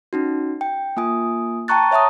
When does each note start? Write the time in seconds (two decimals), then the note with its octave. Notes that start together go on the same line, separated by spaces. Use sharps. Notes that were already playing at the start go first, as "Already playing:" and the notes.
0.13 C#4 D#4 F#4
0.61 G5
0.97 A#3 F4 G#5 D#6
1.68 G5 A5 A#5 C#6 F#6 A6
1.91 C#5 E5 A5 A#5 D#6